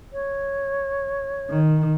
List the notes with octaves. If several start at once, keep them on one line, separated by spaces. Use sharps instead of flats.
C#5
D#3